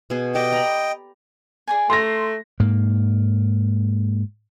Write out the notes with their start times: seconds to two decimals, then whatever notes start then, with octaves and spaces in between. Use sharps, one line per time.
0.10 B2 G#4
0.35 G4 A4 D5 D#5 G5
0.52 A#5 B5
1.67 G#4 D5 G#5
1.90 A3 A#5 C6 D#6 A#6
2.60 G#2 A#3